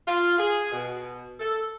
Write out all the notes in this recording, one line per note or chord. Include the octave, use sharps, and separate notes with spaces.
F4
G#4
B2
A4